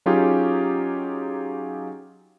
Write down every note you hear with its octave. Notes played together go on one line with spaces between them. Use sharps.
F#3 C#4 D#4 F4 G4 G#4